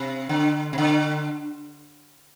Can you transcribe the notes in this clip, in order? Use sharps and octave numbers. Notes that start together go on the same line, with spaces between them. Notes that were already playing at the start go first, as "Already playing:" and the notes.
Already playing: C3
D3
C3
D3